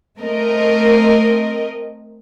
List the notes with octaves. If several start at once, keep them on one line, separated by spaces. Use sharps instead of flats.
A3 C4 A#4 D#5